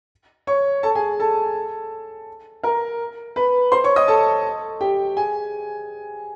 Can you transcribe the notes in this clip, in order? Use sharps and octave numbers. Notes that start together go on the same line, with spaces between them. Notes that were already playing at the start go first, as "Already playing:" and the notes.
C#5 C#6
A4 A5
G#4 G#5
A4 A5
A#4 A#5
B4 B5
C5 C6
C#5 C#6
D#5 D#6
A4 A5
G4 G5
G#4 G#5